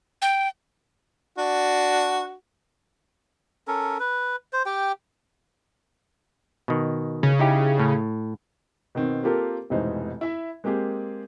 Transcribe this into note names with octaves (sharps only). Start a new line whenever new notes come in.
G5
D4 F#4
C#4 A4 A#4
B4
C5
G4 G5
B2 D#3
C#3
D#4 E4 G4
A2
B2 D#3 C4
A#3 C4 F4 G4 A4 A#4
F1 G#2 B2 E3 D#4 C5
E4 E5
G#3 A#3 C4 G4 G#4